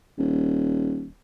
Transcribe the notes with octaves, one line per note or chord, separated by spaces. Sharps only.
D#1